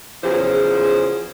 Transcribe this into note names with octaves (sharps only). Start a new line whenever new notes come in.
E2 C#3 F3 F#3 G#4 C5